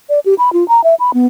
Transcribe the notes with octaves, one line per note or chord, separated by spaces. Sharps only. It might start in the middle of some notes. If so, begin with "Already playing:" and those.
D5
G4
B5
F4
A#5
E5
B5
B3